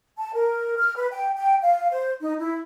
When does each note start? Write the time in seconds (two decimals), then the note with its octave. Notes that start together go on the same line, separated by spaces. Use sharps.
0.18 A5
0.34 A#4
0.77 F6
0.96 B4
1.12 G5
1.36 G5
1.63 F5
1.91 C5
2.21 D#4
2.39 E4